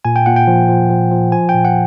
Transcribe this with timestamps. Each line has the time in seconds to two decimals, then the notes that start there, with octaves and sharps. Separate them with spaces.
0.05 A#2 G#5
0.16 G5
0.26 A#2 F#5
0.36 G5
0.47 F3
0.69 F3
0.90 F3
1.11 F3
1.32 F3 G#5
1.49 G5
1.54 A#2
1.65 F#5